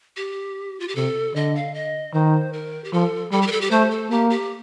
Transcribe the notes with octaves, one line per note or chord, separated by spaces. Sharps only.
G4
F4
G4
C3 A4
D3 D#5
F5
D#5
D#3 C5
A#4
G4
F3 A4
G3 A4
G4
A#4
A4
G4
A3 C5
A4
A#3 G4
G4